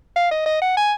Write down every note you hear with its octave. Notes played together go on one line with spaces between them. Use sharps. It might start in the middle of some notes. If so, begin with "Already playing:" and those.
F5
D#5
D#5
F#5
G#5